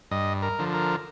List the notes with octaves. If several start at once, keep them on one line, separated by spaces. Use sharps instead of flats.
G2 D#5
A#4
D3 F3
A#4